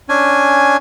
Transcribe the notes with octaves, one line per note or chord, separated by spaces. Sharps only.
C#4 D4 G#5